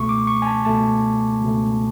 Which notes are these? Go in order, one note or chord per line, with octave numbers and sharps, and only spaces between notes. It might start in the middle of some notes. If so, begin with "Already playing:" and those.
Already playing: C#2 B2 A3 C#6
D6
C#6
G#5
A5
C#2 B2 A3 A5
C#2 B2 A3